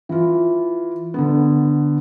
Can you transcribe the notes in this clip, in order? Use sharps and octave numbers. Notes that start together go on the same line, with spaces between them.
E3 F4
D3 B3